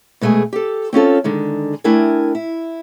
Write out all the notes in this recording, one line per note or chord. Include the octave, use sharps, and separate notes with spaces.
B2 G#3 A3 G#4 G#5
G4 A4
C4 C#4 F4 A4
D3 D#3 G#3
A3 D4 E4 A#4 G5 G#5
E4